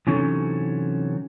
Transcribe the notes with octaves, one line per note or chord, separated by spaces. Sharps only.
C3 E3 F#3 C#4 D#4 A4